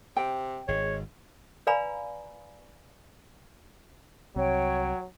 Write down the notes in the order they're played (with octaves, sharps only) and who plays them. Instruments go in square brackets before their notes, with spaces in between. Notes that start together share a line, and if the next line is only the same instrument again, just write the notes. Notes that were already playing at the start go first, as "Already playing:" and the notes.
[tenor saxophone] C3 [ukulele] G5
[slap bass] G#1 [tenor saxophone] G#3 [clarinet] C#5
[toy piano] B4 D5 F5 G#5 A#5 B5
[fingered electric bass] C2 C4 [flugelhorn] F#3 [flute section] C#5 G5